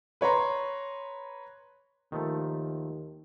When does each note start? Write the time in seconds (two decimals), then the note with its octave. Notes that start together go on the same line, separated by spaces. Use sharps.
0.21 B4 C#5 A#5 C6
2.12 D#2 D#3 F3 A3